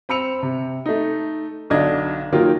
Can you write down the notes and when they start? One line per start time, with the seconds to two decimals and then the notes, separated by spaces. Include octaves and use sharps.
0.09 C4 B5 E6 C#7 F7
0.43 C3
0.86 A3 D#4
1.70 B1 D3 D4 D#5 G#6
2.32 D#3 F#3 A#3 D#4 F4 G4